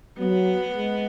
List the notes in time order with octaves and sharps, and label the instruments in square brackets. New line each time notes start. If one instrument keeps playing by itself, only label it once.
[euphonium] F#3 [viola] B3
[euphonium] G#3